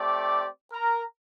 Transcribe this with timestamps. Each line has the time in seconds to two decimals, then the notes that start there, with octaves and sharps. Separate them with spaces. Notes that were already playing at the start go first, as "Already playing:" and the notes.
Already playing: A3 C4 G4 D5 D6
0.73 A#4 A#5